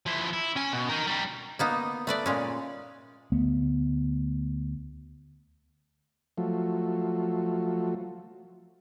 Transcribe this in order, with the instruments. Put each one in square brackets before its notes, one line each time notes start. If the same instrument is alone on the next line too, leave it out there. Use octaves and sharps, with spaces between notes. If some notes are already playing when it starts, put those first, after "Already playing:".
[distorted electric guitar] F3 E4
E4
C#4 G#5
B2
D#4 A#4
G3 A#4
[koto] A#3 B3 D#4
A3 B4 D5
A#2 G#3 C#4
[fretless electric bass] D2 A3 B3
[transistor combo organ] F3 F#3 A3